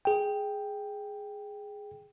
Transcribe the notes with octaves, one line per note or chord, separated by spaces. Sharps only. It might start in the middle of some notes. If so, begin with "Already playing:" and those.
G#4 G5